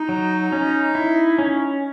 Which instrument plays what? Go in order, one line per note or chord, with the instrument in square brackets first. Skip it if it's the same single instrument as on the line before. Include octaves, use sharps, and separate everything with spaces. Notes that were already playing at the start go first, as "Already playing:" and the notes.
Already playing: [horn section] D#4
[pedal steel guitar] F#3
C#4
E4
C#4